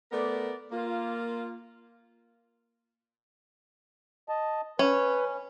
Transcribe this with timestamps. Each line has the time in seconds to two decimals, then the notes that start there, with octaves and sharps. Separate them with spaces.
0.12 A3 B3 A#4 D5
0.71 A#3 F4
4.29 D#5 A5
4.79 C#4 B4